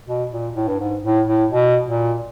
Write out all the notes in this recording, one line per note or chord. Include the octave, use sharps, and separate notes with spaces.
B2
A#2
A2
G2
G#2
A2
A2
B2
A#2